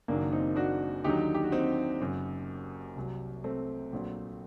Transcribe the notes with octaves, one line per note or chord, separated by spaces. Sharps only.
F#1 F#2 D#3 F#3 A#3 D4
C4 D#4
D4 F#4
D#2 D3 F#3 D#4 G4
G4
F#4
C4 D#4
F#1 F#2 F#3
C2 C3 F#3
A3 C4
A#1 A#2 F#3